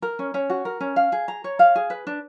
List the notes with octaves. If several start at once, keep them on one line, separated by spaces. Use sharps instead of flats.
A#4
C#4
C#4
F#4
A#4
C#4
F5
G#4
A#5
C#5
F5
G#4
B4
D4